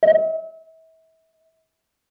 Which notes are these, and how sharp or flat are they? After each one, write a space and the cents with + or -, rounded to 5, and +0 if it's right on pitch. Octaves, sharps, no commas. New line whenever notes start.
E5 -35